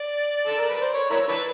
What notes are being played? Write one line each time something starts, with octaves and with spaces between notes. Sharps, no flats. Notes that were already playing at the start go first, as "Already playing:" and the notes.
Already playing: D5
A4
A#4
B4
C5
C#5
E4 A#4 C#5
D4 E4 B4